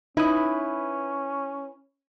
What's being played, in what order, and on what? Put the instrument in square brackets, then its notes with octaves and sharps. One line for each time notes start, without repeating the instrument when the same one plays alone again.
[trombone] C#4 [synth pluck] D#4 D#6 [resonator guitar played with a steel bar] E4 B4